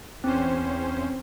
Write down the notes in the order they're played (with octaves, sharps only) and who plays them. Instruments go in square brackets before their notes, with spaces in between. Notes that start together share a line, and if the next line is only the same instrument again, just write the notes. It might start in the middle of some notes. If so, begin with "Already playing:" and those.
[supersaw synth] E2 C#4 C5 [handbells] C4